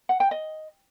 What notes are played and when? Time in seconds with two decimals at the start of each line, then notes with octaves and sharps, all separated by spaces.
0.09 F#5
0.20 G5
0.31 D#5